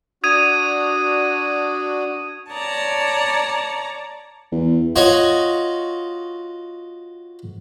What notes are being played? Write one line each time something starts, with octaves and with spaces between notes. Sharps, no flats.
D4 F#4 D#6 G#6 D#7
C#5 D5 A5 A#5
E2
F4 F#4 C#5 D#5